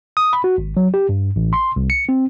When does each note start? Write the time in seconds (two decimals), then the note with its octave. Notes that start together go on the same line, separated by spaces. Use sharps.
0.17 D#6
0.33 B5
0.44 F#4
0.58 G#1
0.77 F#3
0.94 G4
1.09 G2
1.36 A1
1.53 C6
1.76 C2
1.90 C#7
2.09 C4